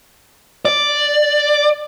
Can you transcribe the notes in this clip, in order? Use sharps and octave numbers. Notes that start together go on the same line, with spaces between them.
D5